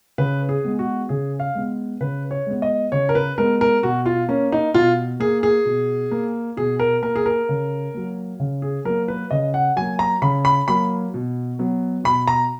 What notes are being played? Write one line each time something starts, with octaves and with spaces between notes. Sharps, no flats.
C#3 B4
G#4
G#3 B3
F#4
C#3 G#4
F5
G#3 B3
C#3 B4
C#5
G#3 B3
D#5
C#3 C#5
A#4
B4
G#3 B3 A#4
A#4
B2 F#4
F4
A#3 C#4
D#4
B2 F4
A#3 G#4
G#4
B2
A#3
B2 G#4
A#4
A#3 A#4
G#4
A#4
C#3
F#3 A#3
C#3
G#4
F#3 A#3 A#4
B4
C#3 D#5
F#5
F#3 A#3 G#5
A#5
C#3 B5
B5
F#3 A#3 B5
B2
F#3 B3
B2 B5
A#5